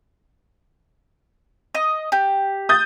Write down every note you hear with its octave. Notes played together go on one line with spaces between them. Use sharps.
D#5
G4
D#6 G6 A6